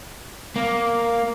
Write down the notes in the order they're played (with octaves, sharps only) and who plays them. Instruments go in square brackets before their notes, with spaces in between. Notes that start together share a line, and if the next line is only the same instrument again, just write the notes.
[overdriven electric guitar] A#3